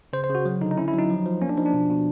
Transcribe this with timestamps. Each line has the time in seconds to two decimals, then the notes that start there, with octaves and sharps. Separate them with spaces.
0.13 C#3 C5
0.24 C5
0.29 C#3
0.35 F#4
0.46 F#3
0.61 D3 D#4
0.71 D#4
0.77 C#4 E4
0.88 E4
0.94 F#3
0.99 D#4
1.10 F3
1.26 F3
1.42 A#3 C#4
1.49 D4
1.58 F3 D#4
1.66 D4
1.74 B2
1.90 B2